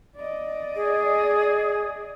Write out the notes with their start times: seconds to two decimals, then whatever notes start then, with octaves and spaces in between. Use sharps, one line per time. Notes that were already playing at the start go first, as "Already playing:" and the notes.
0.16 D5 D#5
0.75 G#4